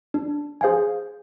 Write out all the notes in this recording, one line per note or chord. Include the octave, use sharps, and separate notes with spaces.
D4
G#4 C5 F5 G#5